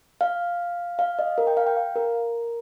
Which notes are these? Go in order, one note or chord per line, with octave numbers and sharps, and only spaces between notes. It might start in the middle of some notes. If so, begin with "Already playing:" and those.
F5
F5
D#5
A#4
G5
F5
G5
F5
A#4